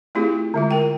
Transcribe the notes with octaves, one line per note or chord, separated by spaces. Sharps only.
A3 C4 E4 F4 G4 G#4
D3 G#3 F4
A#4 G5